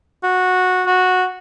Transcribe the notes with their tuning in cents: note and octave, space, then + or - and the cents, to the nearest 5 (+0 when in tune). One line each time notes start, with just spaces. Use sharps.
F#4 -10
F#4 -10